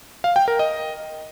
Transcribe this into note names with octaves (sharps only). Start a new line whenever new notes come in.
F5
G5
A#4
D#5